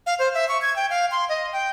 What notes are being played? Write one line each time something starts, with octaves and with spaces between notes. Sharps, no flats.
F5
C5
E5
C#6
G#6
G5
F5
C6
D#5
G5